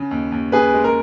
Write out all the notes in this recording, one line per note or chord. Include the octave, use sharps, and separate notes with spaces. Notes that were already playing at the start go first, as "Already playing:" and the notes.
Already playing: C#3
D#2
D#2
C#3 G#4 B4
G#3
A#4